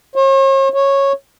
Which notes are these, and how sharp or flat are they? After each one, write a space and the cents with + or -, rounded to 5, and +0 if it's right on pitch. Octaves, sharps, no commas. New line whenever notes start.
C#5 -45
C#5 -10